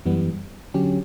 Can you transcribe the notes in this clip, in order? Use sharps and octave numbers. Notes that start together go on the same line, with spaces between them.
F#2 E3 G3 B3
D3 F#3 C#4 G4